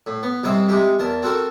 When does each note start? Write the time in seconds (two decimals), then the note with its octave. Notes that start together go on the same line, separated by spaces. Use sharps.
0.06 A2
0.23 B3
0.43 C2 G#2 C3 C4 D#5 E5
0.69 C3 G#3 D#4 G4
0.99 E2 A#4 A5
1.22 C4 F#4 A4 A#4